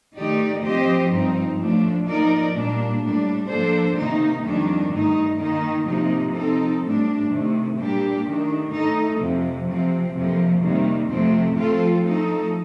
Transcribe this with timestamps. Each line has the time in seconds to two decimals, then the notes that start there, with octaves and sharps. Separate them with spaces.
0.16 D#3 A3 D#4 G4 D5
0.63 F3 C4 G4 C5 D#5
1.10 G2 F3 C4 D#4
1.59 A2 F3 A3 D4
2.06 F3 A#3 D#4 A#4 D5
2.53 A#2 G3 A#3 D4
3.01 A2 G3 D4
3.48 F3 A#3 D4 A4 C5
3.96 C3 D#3 A#3 D#4
4.43 F2 D#3 G3 D4
4.91 G2 D#3 A3 D#4
5.39 D#3 A#3 D#4
5.87 C3 F3 A#3 D#4
6.34 F3 C4 D#4 A4
6.82 A2 G3 D4
7.29 C3 D#3 A3
7.77 A#2 G3 D4 G4
8.25 D#3 A3 D4
8.72 A2 A3 D#4 A4
9.20 F2 C3 F3
9.68 C3 F3 C4
10.15 F2 C3 F3 A#3
10.62 C3 D#3 G3 A#3
11.10 F2 C3 F3 A3 C4
11.57 F3 A3 C4 F4 A4
12.04 F3 A3 D#4 A4